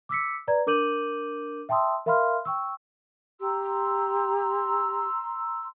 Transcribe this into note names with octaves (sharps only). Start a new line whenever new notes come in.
D6 E6 B6 C#7
B4 D5 A#5 G#6
D4 A#4 D6 G6 D#7 F#7
E5 G5 A5 C6 D#6 E6
A#4 E5 F5 B5 C6 F6
G5 C#6 E6
G4 A#5 C6 E6